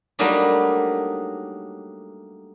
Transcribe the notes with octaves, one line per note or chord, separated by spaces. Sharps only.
F#3 G3 A3 A#3 D4 D#4